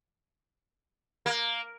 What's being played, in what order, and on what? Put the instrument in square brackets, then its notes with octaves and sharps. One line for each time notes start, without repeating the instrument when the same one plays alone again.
[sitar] A#3